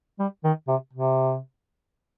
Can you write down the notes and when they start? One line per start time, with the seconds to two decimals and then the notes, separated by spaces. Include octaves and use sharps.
0.19 G3
0.44 D#3
0.68 C3
0.93 C3